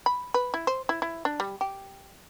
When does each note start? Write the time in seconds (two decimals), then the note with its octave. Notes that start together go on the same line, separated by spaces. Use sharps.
0.06 B5
0.34 B4
0.54 E4
0.67 C5
0.89 E4
1.02 E4
1.25 D4
1.40 G3
1.61 G4